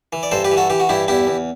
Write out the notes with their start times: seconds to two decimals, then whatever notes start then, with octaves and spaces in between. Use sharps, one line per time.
0.13 E3
0.23 D5
0.31 G2 A4 C5
0.44 G4 B4
0.51 E3
0.57 F#4 A4
0.70 E3 G4
0.80 F#4
0.89 G2 E4 G4
1.08 E2 E4 G4
1.27 E2